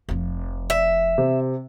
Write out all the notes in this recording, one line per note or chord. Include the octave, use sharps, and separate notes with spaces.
F1 F3
E5
C3